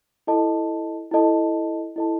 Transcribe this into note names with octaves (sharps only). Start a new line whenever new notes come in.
E4 A4 D#5 A5
E4 A4 D#5 A5
E4 A4 D#5 A5